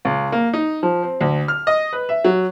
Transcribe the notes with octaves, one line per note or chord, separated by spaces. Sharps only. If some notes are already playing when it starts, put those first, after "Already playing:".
C#2
A#3
D#4
F3
C4
D2
F6
D#5
B4
E5
F#3